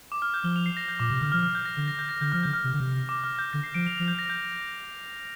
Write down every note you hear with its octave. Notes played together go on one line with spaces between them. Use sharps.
D6
F6
G6
F3 G7
F7
C7
A#6
G6
A#2 D6
C3 D6
D3 F6
F3 F6
F6
G6
A#6
D3
A#6
G6
A#6
D3 G6
F3 F6
D3 G6
F6
C3
D3
C3
D6
F6
G6
D3 A#6
C7
F3 D7
F7
F3 F7
G6
A#6
G6